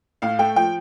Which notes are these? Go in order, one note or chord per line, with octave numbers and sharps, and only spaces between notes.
A2 F5
A3 G5
F3 G5